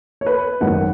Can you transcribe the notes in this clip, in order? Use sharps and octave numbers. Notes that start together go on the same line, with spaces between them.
C#5
B4
G#1 F#2 D#3 F#5